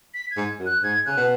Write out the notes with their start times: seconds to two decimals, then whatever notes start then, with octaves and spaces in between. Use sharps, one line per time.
0.14 B6
0.31 G#6
0.37 G#2
0.60 F#2
0.66 F#6
0.83 G#2 G#6
1.06 C#3 F#6
1.17 B2